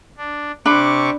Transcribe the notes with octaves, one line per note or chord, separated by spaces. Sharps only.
D4
C3 D4 B5 C#6 D6